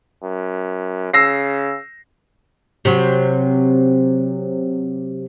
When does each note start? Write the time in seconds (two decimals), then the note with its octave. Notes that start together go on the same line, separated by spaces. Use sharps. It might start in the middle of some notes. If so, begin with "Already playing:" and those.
0.23 F#2
1.14 C#3 E6 A#6 C7
2.85 C3 F#3